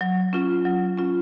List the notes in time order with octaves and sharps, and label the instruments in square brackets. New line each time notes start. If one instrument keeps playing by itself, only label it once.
[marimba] F#3
C#4 F4
F#3
C#4 F4